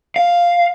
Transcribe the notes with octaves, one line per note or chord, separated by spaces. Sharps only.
F5